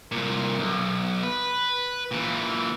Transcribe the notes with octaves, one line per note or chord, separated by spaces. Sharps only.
C2 A#2
B1
B4
A#2 E3